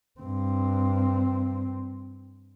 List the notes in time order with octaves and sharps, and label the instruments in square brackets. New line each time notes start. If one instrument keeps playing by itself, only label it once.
[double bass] G2 C4